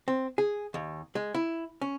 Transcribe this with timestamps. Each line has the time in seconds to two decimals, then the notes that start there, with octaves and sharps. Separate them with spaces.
0.08 C4
0.38 G#4
0.74 D#2
1.15 G#3
1.34 E4
1.82 C#4